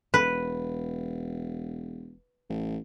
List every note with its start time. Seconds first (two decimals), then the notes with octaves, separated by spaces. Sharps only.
0.14 E1 B4
2.50 A1